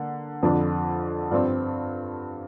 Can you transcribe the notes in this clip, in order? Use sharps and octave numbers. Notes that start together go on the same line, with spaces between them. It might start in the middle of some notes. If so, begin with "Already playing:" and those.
Already playing: D3 A#3
F2 D3 F3 D4
G2 F3 C4 D5